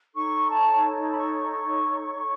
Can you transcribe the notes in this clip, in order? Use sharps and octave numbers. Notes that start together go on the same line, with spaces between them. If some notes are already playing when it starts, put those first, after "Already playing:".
D#4 A4 C#5 C#6
A5
B5
C#6
C#6